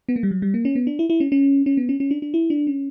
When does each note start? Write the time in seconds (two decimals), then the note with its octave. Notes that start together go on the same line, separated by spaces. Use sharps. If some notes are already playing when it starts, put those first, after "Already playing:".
0.09 B3
0.16 A#3
0.23 G3
0.31 F#3
0.42 G3
0.54 A#3
0.65 C#4
0.75 B3
0.87 D4
0.99 E4
1.10 E4
1.20 C#4
1.32 C#4
1.66 C#4
1.77 B3
1.89 C#4
2.00 C#4
2.11 D4
2.22 D4
2.34 E4
2.50 D4
2.67 C#4